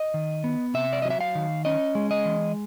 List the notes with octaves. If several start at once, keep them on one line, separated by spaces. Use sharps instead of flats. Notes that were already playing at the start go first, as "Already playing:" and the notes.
Already playing: D#5
D#3
B3
C3 E5
D5
F#3 D#5
E5
F5
D#3
C#4 D#5
G#3
D#5
E3